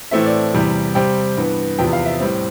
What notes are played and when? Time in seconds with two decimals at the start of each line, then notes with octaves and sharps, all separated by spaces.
0.11 A2 E3 A3 C4 E5
0.26 D5
0.54 E2 C3 E3 G3
0.95 C3 G3 C4 G5
1.37 G2 E3 B3
1.78 E2 C3 F3 B3 G5
1.93 F5
2.06 E5
2.20 A2 G3 C4